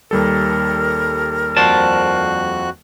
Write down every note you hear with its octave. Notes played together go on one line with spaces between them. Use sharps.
D#2 G3 A4 A#4
F2 F#4 C5 D5 A5 F#6